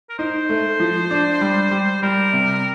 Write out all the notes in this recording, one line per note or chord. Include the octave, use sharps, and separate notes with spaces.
A#4
D#4 C5
A3
F3
D4
G3
G3
G3 A#4
C3